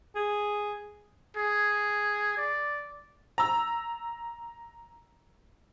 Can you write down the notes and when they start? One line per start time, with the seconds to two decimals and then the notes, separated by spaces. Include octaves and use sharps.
0.15 G#4
1.37 G#4
2.37 D5
3.38 A#5 E6